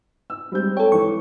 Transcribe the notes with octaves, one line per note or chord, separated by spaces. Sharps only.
E6
G3 G#3 C4 G6
A4 C#5 G5
E3 C#6